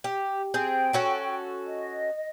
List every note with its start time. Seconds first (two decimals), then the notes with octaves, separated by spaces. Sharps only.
0.04 G4
0.54 C4 G#4 G5
0.93 C#4 F#4 A4
1.65 D#5